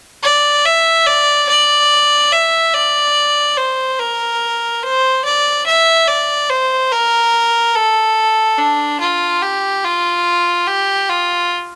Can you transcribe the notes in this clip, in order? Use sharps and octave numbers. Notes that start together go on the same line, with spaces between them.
D5
E5
D5
D5
E5
D5
C5
A#4
C5
D5
E5
D5
C5
A#4
A4
D4
F4
G4
F4
G4
F4